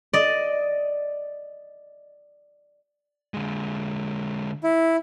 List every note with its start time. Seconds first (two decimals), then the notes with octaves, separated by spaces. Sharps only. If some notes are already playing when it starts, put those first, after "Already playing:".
0.13 D5 D#5
3.34 D3 G#3
4.64 E4